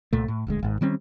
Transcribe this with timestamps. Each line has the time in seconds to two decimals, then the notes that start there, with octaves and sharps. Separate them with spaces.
0.13 C2 A#2 A3
0.28 A2
0.47 D#1 D2 G#3
0.63 G#1 G#2
0.81 D#3 G3 C4 C#4